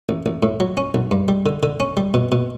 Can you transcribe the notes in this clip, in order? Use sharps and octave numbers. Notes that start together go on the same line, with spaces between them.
A1
A1
A2
F#3
C#4
B1
G2
G3
D3
D3
C#4
G3
B2
B2